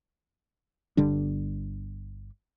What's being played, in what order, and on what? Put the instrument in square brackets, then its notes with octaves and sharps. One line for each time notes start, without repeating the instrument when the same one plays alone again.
[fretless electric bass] G1 D3 G3 D4